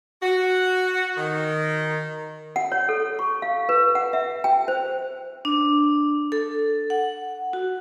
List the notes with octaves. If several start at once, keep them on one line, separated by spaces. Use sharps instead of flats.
F#4
D#3
F#5
C#5
A4
C#6
F5
B4
F#5
E5
G5
C5
D4
A4
F#5
F#4